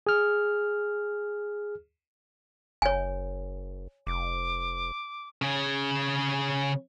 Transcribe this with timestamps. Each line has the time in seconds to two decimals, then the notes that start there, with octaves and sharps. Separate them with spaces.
0.07 G#4 F6
2.82 F#1 C#5 G#5
4.07 F1 D6
5.42 C#3 G#4